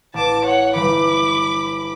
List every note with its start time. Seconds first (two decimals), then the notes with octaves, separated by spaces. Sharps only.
0.14 A1 A5 D6 E7
0.45 C#5 F#5
0.75 G1 E3 B5 D6